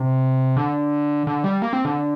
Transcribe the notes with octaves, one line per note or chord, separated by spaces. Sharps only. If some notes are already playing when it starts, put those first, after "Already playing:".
Already playing: C3
D3
D3
G3
A#3
C4
D3